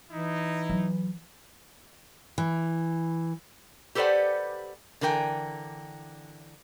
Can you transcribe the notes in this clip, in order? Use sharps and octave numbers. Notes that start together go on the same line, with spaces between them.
E3 D#4 E4
F#3
E3
G4 A4 B4 C5 D5 F#5
D3 E3 A#4 G5 G#5